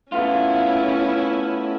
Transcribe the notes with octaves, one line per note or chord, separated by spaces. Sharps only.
A3 B3 C#4 E4 F4